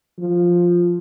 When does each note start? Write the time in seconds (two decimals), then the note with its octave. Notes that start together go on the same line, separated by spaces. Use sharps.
0.19 F3